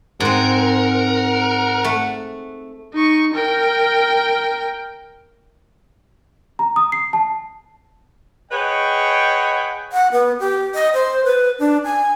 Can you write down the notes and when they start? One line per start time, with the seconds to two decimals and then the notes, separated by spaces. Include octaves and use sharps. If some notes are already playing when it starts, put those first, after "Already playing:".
0.20 G#2 C4 A#4 F#5
1.84 A3
2.94 D#4 C#6
3.34 A#4 G5
6.59 A#5
6.76 D#6
6.92 C7
7.13 A5
8.51 G#4 B4 C#5 D#5 F#5 G5
9.92 F#5
10.12 B3
10.40 G4
10.74 D#5
10.93 C5
11.25 B4
11.59 D4
11.84 G#5